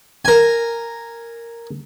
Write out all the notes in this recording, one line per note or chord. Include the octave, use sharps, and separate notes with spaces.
A#4 G#5